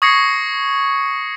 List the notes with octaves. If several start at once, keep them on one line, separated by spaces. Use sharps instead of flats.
C#6 D#6 G#6 A#6 C7 C#7